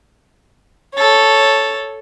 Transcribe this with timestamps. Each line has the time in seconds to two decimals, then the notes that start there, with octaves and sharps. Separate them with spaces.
0.94 A4 C#5